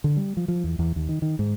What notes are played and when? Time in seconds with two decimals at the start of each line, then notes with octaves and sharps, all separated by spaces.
0.04 D3
0.17 G3
0.37 F3
0.48 F3
0.64 E2
0.79 E2
0.96 D#2
1.09 D#3
1.22 D#3
1.39 G#2